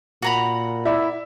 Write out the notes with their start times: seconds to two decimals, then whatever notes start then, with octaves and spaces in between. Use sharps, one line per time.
0.22 A#2 F#4 A#5 B5
0.85 E4 D5 E5